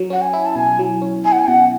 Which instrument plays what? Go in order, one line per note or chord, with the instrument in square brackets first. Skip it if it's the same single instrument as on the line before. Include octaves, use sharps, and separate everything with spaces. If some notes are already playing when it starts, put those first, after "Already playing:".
Already playing: [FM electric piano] F#3
[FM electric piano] C#4 [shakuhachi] F#5
[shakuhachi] G#5
[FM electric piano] E4
[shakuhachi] A5
[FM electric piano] B2 [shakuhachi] G#5
[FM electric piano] F#3
C#4
[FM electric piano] E4 [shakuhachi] G#5
[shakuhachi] F#5
G#5
[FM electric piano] B2 [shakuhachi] F#5